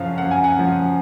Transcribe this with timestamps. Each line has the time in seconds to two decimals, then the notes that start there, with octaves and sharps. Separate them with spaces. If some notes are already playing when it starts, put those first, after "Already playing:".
Already playing: F#2 C#3 F3 F5
0.18 F#2 F#5
0.31 G#5
0.44 F#5
0.57 C#3 F3